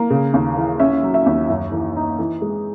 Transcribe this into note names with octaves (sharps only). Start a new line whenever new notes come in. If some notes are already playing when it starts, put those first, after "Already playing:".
Already playing: A#3
C#3
D#2
E3
C#4 E5
F#3
E5
D#2
F#2
E3
D#4
E3
G#3